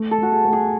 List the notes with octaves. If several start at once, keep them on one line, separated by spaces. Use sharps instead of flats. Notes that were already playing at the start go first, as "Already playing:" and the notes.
Already playing: A3
A4
A3 F#4
G#4
A3
G#4